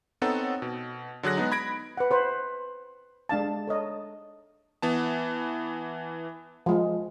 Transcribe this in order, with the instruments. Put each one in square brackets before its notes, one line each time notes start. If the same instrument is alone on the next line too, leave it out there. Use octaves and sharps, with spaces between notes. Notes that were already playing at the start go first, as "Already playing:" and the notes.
[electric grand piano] B3 C4 D#4 A4 C#5 F#5
B2
D3 F#3 G#4 F#6 A#6
G#3 B3 D#4
B5 G#6 A#6 D7
[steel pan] B4 F#5
B4 C5
G#3 D4 F5 A5
A4 C#5 D#5
[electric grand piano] E3 B3 A5
[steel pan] F3 G#3